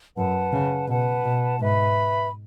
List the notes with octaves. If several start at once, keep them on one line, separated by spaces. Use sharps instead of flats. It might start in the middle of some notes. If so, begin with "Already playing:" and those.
F#2 B4 F#5 A5
C#3
B2 B4 F#5 A5
B2
G#2 B4 E5 B5